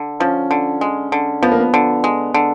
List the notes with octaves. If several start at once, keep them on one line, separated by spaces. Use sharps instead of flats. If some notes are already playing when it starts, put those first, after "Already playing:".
Already playing: D3
F3 C#4
D3
G#3
D3
F3 B3
A#3
B3
D3
G#3
D3